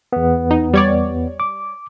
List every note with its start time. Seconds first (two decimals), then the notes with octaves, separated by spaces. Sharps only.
0.13 E2 B3
0.51 D#4
0.73 G3 C#5 D5
1.40 D6